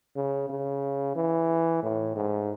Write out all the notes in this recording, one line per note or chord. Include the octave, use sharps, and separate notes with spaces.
C#3
C#3
E3
A2
G#2